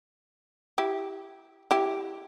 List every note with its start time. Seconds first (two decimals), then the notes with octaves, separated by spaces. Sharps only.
0.78 E4 G4
1.71 E4 G4